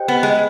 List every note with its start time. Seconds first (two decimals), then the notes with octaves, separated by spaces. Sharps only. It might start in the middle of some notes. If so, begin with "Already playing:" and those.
Already playing: G4 C5 D#5 G5
0.08 B3
0.23 G#3